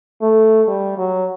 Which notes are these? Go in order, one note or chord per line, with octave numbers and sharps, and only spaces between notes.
A3
G3
F#3